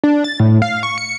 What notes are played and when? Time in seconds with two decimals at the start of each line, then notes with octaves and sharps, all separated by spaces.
0.04 D4
0.24 A6
0.40 A2
0.62 F5
0.83 C#6
0.98 C#7